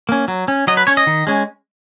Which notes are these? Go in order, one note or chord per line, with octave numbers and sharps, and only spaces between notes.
A#3 C#4
F#3
C#4
F#3 D#5
B4
C#4 C#5
D#5
D#3
G#3 C#4